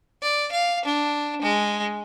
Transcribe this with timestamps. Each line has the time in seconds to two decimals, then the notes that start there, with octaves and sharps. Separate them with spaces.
0.22 D5
0.52 F5
0.85 D4
1.42 G#3